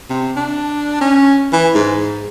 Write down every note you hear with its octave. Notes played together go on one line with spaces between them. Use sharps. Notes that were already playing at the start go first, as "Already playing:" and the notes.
C3
D4
C#4
E3
G#2